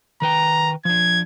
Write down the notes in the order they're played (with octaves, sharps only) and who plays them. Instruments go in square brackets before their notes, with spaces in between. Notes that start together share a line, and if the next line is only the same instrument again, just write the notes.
[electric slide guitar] D#3 B4 G5 [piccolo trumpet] A#5
[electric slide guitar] F3 D4 [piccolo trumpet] G#6